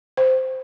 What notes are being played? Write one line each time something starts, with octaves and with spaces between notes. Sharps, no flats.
C5